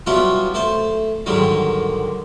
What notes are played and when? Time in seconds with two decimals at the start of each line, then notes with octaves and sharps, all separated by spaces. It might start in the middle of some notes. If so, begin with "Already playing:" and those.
0.06 F#3 G3 B3 C#4 E4 F4
0.54 A3 A4 C5
1.26 G#2 D3 D#3 F#3 G3